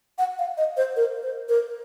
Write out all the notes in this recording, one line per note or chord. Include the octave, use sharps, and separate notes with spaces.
F#5
F5
D#5
C5
A#4
C5
A#4